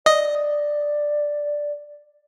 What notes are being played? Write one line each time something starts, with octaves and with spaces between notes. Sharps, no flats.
D5 D#5